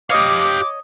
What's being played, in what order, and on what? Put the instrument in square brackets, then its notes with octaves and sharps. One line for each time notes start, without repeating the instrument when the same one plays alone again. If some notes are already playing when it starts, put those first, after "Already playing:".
[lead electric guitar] G4 F5 [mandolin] C#5 D#5 [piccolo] D6